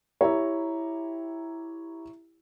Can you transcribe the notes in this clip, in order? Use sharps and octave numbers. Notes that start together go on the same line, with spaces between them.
E4 G4 C#5 E5 A#5